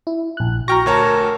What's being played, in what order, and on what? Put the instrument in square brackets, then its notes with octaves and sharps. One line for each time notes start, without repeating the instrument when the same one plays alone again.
[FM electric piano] E4
A#1 F#6
[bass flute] F#4 [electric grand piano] G5 C#6 [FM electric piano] A#5 F6 A#6
[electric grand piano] D2 C#5 A5 [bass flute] A#4